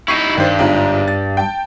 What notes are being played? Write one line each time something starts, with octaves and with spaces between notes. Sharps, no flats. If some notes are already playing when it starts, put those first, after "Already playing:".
D#4 E4 C#6 C7 D#7
G2 D#3 C5
G1 G#2 F4
A6
G5 A5